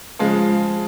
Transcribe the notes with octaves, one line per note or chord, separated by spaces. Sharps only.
C#3 F3 G#3